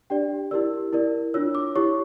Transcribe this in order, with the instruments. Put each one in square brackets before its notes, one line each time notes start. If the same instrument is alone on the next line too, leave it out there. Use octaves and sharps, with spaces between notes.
[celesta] D4 G4 D5 G5
E4 G4 A#4 D5 E6
E4 A#4 D5
D4 F4 C#5 E6
D6
E4 G4 C#5 C#6